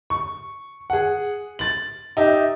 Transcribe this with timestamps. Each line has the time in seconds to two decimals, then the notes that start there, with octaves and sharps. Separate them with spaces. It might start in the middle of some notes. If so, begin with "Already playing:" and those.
0.10 C#6
0.90 G#4 F#5
1.59 A6 F#7
2.17 D#4 G4 E5